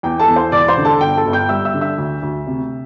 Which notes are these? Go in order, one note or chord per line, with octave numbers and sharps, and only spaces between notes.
E2 G5
A4 A5
E2
C5 C6
E1 D5 D6
C5 C6
D3
A4 A5
G1 G5
A4 A5
G1
G5 G6
G3 E5 E6
E5 E6
D3
E5 E6
D2
D2
C3